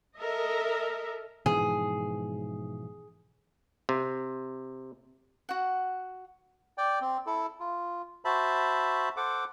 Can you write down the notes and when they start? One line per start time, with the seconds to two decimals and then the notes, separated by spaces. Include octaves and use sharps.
0.18 A4 A#4 D#5 E5
1.46 G#2 B2 E3 F3 G#4
3.89 C3
5.49 F#4 F#5
6.78 D5 G5
7.01 C4
7.26 E4 A4
7.60 F4
8.25 F#4 C5 E5 A5 B5
9.17 A4 C5 F#5 D6